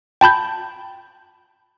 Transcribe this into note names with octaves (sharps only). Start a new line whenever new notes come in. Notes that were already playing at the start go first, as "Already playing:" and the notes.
G5 A5 B5 G6